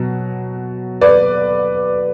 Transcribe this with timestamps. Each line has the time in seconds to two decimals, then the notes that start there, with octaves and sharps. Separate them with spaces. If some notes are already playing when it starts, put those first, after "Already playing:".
Already playing: B2 F#3
1.01 B4 D5